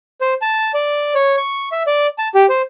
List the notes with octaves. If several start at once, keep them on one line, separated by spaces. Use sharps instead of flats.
C5
A5
D5
C#5
C#6
E5
D5
A5
G4
C5